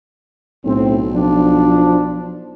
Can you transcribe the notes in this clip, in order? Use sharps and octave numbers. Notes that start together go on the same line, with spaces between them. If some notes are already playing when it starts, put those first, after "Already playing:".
B1 A2 C4
F3 D4